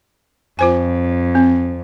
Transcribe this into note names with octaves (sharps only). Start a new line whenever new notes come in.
F2 F4 C5 G#5
C4